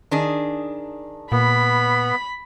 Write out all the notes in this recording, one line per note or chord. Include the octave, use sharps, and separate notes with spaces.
D#3 D4 G#4
A#2 B3 B5